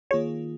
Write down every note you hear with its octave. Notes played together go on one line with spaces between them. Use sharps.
D#3 A#3 F4 G#4 C#5